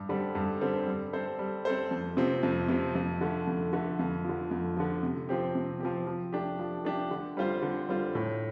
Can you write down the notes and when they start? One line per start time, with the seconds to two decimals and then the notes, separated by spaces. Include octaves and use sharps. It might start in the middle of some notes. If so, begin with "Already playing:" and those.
Already playing: G2
0.09 D3 G3 C4 A4
0.35 G2
0.61 D3 G3 C4 A4
0.87 G3
1.13 C4 A4 C5
1.39 G3
1.65 C4 A4 C5
1.91 F2
2.17 C3 F3 C4
2.43 F2
2.68 C3 F3 C4
2.95 F2
3.21 D3 A3
3.47 F2
3.73 D3 A3
3.99 F2
4.24 D3 F3
4.51 F2
4.77 D3 F3
5.03 C3
5.29 F3 C4 G4
5.55 C3
5.80 F3 C4 G4
6.07 F3
6.33 A3 D4 G4
6.59 F3
6.85 A3 D4 G4
7.11 D3
7.37 G3 C4 F4 C5
7.62 D3
7.89 G3 C4 F4 C5
8.15 A2